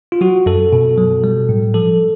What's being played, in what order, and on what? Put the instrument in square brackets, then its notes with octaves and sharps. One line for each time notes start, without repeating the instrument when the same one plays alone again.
[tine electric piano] F4
F#3 F#4
F#2 A4
B2
F#3
G3
A2
F3 A4